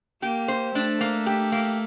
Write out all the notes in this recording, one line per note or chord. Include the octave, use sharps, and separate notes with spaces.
A#3 G4
C5
A3 D4
A#3
G4
A#3